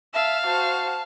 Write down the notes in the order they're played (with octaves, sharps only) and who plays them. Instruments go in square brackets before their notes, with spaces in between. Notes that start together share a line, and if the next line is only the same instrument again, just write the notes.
[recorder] E5 [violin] F5 [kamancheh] A5 E6
[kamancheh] F#4 C5 [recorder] A5